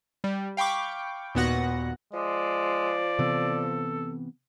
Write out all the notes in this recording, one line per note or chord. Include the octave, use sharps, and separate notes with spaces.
G3
F5 G5 B5 C#6 D6
D#2 A#2 B3 F#4 F#5 A#6
F3 G#3 D5
C3 E3 B3 A4